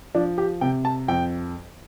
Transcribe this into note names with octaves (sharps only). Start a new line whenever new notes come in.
F3 D4
G4
C3 G5
A5
F2 G5